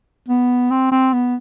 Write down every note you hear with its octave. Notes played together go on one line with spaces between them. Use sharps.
B3
C4
C4
B3